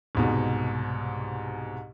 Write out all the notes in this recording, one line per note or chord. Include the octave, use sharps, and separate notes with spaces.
C2 G#2 B2